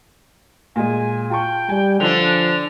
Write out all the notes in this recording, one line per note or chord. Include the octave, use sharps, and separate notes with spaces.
A#2 G#3 G#5
F4 G5 A5 C#6
G3 G#5
D3 F3 D4 F7